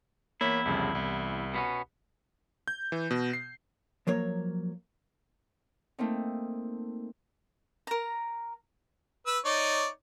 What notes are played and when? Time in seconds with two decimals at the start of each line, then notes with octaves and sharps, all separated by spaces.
0.41 E2 A#3 E4 C#5 B6
0.66 C2 F2 C#3
0.95 C2
1.54 B2 B3 C#4
2.68 G6
2.92 E3
3.11 B2
3.33 C7
4.07 F3 F#3 A#3 C#5
5.99 A3 A#3 C4 D#4
7.87 A#4 A#5
9.27 B4 E6
9.45 D#4 C#5 D5